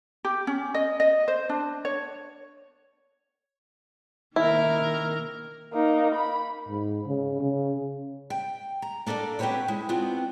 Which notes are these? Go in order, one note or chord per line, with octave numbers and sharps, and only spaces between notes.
G4
C#4
D#5
D#5
C5
D4
C#5
D#3 A#3 E4 A#4
A#3 D#4
B5
G#2
C#3
C#3
G5
A#5
A#3 D4 A4 A#4 D5
C4 C#4 F#4 G4 B4 C#5
G#3 E4
B3 C4 D4 F4 F#4